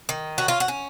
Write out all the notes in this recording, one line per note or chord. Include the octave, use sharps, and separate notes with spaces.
D#3
C#4 F#4
F4
F#4
C#4